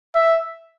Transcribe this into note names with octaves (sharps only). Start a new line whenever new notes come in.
E5